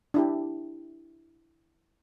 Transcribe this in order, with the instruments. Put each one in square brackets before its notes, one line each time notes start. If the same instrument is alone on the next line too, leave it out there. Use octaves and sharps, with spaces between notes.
[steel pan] D4 E4 G4